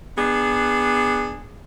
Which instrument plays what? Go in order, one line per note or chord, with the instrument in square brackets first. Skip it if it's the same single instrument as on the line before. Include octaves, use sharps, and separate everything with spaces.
[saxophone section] B3 D4 G#4